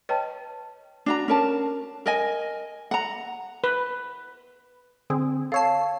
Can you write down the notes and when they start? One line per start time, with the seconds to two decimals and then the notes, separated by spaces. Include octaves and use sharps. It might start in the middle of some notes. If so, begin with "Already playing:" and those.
0.09 B4 C#5 D#5 G5 A5
1.06 D4 F#4 A#5
1.28 C#4 A#4 A5
2.06 A#4 D#5 G#5
2.91 F#5 A#5
3.64 B4
5.10 D3 C4 G#4
5.52 A4 C#5 F5 A5 C7